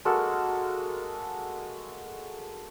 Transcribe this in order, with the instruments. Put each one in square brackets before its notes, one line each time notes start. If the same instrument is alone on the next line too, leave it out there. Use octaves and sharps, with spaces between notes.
[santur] G#3 A#3 F#4 A4